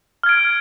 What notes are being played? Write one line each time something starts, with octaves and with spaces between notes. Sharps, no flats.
F6 G#6 D7